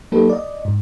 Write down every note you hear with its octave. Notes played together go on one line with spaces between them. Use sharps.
F#3 A#3 D#4 G4 A4 B4
D5 D#5
G#2